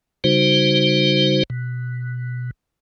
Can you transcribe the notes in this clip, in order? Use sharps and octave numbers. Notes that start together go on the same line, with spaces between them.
C#3 G3 D#4 F#4 C5
B2